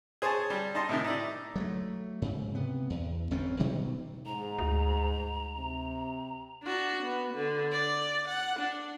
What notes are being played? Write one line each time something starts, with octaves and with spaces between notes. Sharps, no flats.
G#4 C5 C#5 G#5 A5
G3
D#4 D#5 A5 C6
A2 C3 D#3
D#4 E4 D5
F#3 G#3 A3
G#2 C#3
C3 B3
E2
G1 F2 C4 C#4
B2 D#3 F#3 G3
G#2 A#5
D2
C3
D4 F#4
B3
D3
D5
F#5
D4